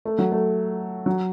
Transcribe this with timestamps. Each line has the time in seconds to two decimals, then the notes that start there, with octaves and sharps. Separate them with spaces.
0.05 A3
0.19 F#3
0.32 A3
1.06 F#3